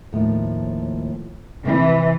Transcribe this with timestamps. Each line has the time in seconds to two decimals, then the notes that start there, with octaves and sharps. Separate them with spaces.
0.13 D#2 A2 F3
1.65 C3 E3